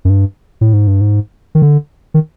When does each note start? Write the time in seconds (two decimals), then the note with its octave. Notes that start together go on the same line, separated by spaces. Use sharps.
0.05 F#2
0.10 G2
0.61 A2
0.73 G#2
0.87 G2
1.01 G#2
1.55 D#3
1.62 D3
2.14 D#3